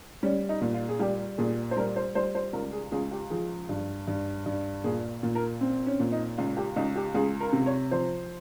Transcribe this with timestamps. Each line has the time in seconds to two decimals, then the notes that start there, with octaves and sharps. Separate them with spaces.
0.23 G3 C#4
0.49 D#4
0.61 A#2
0.74 F4
0.89 G#4
0.99 G3 G4
1.38 A#2 G#4
1.71 C5
1.76 G3 A#4
1.96 C5
2.15 G3 C5
2.35 C5
2.53 C#2 A#4
2.72 G#4
2.92 C#2 G#4
3.11 G4
3.30 F3 G#4
3.69 G2
4.07 G2
4.46 G2
4.84 A#2 G#4
5.23 A#2
5.35 A#4
5.61 C4
5.87 C#4
6.00 A#2
6.12 D#4
6.38 C#2 F4
6.57 G4
6.76 C#2 D#4
6.96 G4
7.14 C#2 G#4
7.40 A#4
7.53 C3
7.66 C#5
7.91 F3 C5